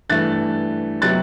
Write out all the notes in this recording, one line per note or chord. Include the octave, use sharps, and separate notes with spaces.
G2 E3 A3 F#6 A6
C3 F#3 B3 F#6 A6